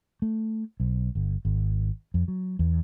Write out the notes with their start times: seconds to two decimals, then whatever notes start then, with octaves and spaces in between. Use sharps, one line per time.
0.22 A3
0.80 B1
1.15 G1
1.45 G#1
2.14 F2
2.28 F#3
2.59 E2